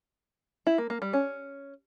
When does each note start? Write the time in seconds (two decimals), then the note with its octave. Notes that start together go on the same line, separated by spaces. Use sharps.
0.67 E4
0.78 A#3
0.90 A#3
1.02 G3
1.13 C#4